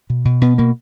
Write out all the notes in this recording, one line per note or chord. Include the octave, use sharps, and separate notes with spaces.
B2
B2
B2 B3
B2 A#3